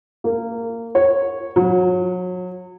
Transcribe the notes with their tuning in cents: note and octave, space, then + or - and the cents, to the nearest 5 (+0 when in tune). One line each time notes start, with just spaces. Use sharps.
A#3 -20
C#5 -10
F#3 -30